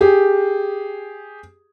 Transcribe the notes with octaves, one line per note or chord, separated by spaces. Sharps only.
G4 G#4